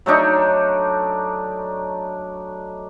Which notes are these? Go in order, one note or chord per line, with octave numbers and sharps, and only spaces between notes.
F#3 A3 D4 D#4